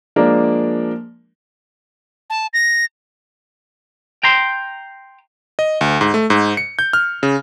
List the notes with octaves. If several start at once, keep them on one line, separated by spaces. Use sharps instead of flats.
F3 G#3 A#3 D4 A#4
A5
A#6
G5 A#5 C6
D#5
D2
G#2
A3
G#2
C#7
G6
F6
C#3